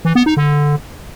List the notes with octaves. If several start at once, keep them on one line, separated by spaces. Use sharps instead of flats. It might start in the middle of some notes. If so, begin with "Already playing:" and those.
E3
B3
D#4
D3